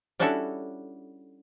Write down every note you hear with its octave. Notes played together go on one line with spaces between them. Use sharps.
G3 C#4 D4 E4 F#4 A4